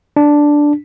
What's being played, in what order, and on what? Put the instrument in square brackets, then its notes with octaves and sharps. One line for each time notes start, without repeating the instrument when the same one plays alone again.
[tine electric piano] D4